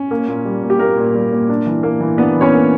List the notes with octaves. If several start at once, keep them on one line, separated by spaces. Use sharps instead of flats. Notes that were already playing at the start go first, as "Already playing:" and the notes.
Already playing: C#4
A#3
A#2
G3
A#2
G4
A#3 A#4
A#2
G3
A#2
D4
E3
A#3
E3
B3 D4 B4
E3
C#4 C#5
A#3